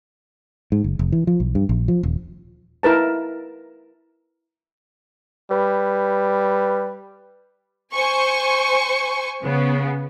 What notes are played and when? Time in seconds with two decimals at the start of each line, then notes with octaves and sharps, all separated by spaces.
0.72 G#2
0.84 F#1
0.99 F1
1.12 E3
1.27 F3
1.40 B1
1.55 G2
1.69 A#1
1.88 F3
2.03 D#1
2.83 E4 A#4 B4 A5
5.51 G3 B4
7.95 C5 G#5 C#6
9.43 C#3 B3